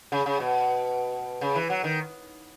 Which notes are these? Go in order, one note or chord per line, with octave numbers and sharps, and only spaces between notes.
C#3
C#3
B2
C#3
E3
F#3
D#3